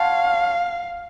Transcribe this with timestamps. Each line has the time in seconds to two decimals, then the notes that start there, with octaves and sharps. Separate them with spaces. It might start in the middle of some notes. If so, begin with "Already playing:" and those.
Already playing: C#5 F5 F#5 A5 C6